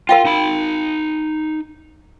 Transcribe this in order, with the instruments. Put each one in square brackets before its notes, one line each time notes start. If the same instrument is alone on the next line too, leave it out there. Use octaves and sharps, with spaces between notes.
[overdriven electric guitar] F4 [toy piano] A#4 F5 G5
[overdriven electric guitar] D#4 B5